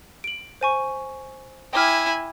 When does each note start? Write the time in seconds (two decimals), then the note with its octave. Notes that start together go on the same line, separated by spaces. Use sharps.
0.24 D7 F#7
0.61 C5 G#5 C#6
1.73 E4 G5 G#5 D6 F6